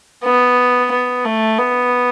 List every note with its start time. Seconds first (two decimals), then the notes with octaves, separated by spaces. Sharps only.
0.24 B3
0.92 B3
1.25 A3
1.59 B3